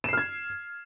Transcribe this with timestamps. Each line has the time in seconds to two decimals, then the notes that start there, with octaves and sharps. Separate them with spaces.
0.04 E7
0.09 C7
0.13 F6
0.17 G#6